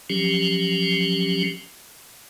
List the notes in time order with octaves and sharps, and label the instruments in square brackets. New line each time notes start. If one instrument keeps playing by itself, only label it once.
[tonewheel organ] F3 F#3 C#4 G4